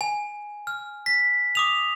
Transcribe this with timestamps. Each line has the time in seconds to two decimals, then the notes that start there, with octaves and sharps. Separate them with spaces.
0.01 G#5
0.67 F6
1.06 B6
1.55 D6 D#6 F7